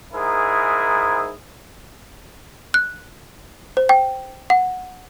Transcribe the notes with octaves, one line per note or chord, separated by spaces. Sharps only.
G#2 E4 G#4 A#4
F#6
C5
G5
F#5